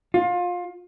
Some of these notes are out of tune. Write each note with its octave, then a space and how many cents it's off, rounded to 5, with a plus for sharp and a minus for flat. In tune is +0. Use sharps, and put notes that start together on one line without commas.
F4 +25